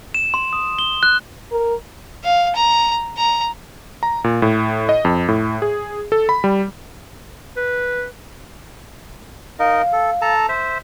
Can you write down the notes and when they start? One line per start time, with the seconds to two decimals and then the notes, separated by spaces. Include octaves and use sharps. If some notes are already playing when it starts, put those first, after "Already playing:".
0.14 E7
0.34 C6
0.53 D#6
0.79 G7
1.03 F#6
1.52 A#4
2.24 F5
2.55 A#5
3.17 A#5
4.03 A#5
4.24 A#2
4.42 A2
4.89 D#5
5.05 F2
5.28 A2
5.62 G#4
6.12 A4
6.29 B5
6.44 G3
7.57 B4
9.59 D#4 A#4 D#5 F5
9.93 A4
10.21 A4 A5 A#5
10.49 C5 E5